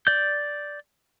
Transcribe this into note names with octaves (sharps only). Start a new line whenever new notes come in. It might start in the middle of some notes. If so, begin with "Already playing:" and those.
D5 G6